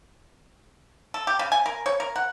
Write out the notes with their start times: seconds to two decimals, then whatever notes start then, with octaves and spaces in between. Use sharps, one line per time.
1.14 A4
1.27 G4
1.39 C#3
1.52 G#5
1.66 A#4
1.86 C#5
2.00 A#4
2.16 F#5